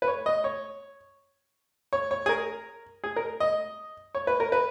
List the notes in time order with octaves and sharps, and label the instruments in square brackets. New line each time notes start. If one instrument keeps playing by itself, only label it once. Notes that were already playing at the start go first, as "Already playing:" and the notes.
[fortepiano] B4
C#5
D#5
C#5
C#5
C#5
G#4
A#4
G#4
A#4
D#5
C#5
B4
A#4
B4